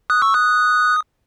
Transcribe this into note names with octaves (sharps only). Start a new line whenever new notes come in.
D#6 F#6
C#6 E6
D#6 F#6